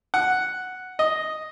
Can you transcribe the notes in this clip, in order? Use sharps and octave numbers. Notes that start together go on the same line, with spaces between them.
F#5
D#5